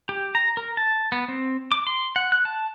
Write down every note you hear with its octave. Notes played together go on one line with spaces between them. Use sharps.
G4
A#5
A#4
A5
B3
C4
D6
C6
F#5
F#6
A5